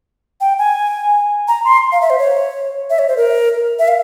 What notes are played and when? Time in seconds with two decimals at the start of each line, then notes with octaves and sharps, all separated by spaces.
0.41 G5
0.59 G#5
1.48 A#5
1.65 C6
1.92 F5
2.01 E5
2.10 C5
2.18 C#5
2.90 E5
2.99 C#5
3.08 C5
3.17 A#4
3.79 E5
3.88 F5